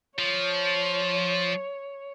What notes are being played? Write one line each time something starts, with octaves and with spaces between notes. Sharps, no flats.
F3 C#5